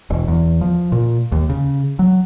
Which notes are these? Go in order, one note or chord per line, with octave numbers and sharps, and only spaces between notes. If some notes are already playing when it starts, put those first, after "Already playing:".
E1
E2
F3
A#2
D#2
C#3
F#3